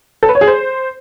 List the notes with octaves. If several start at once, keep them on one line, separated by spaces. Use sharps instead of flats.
A4
B4
C#5
G#4
C5